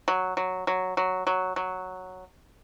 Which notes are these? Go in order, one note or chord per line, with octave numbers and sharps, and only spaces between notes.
F#3
F#3
F#3
F#3
F#3
F#3